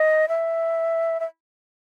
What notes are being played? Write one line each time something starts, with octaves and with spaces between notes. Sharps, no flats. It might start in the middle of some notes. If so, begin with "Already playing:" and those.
Already playing: D#5
E5
E5